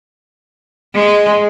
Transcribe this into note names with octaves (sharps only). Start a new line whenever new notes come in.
G#3